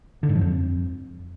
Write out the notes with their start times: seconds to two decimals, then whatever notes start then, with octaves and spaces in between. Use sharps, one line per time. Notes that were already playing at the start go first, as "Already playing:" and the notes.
0.23 D3
0.29 G#2
0.35 F3
0.41 F2